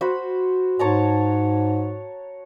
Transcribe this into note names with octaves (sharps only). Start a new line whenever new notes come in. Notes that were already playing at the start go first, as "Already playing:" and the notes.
F#4 C5 B5
G#2 C#5 A5 A#5